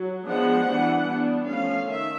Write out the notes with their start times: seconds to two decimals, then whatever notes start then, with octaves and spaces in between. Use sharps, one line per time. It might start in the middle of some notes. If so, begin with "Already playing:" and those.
Already playing: F#3
0.27 F3 G#3 B3 D4 F#5
0.67 E3 G3 B3 D4
1.08 G3 B3 D4
1.48 F3 A3 C#4 F5
1.88 D#3 E5